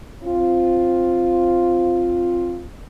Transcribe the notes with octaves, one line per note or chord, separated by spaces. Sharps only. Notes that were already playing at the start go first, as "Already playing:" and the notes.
C4 F4